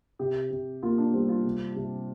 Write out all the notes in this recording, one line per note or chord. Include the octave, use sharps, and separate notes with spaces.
C3 G4
C3
A#3 F4
D4
G3 C4
F4
C3
C3